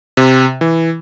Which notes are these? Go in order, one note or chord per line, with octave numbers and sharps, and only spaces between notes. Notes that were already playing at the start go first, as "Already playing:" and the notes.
C3
E3